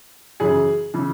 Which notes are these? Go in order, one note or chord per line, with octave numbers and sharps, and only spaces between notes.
F#2 C#3 E3 G#4
C#3 E3